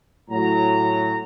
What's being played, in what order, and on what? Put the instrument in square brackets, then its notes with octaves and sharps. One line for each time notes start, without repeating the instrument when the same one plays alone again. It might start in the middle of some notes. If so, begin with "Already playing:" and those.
[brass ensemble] A2 F#3 A#5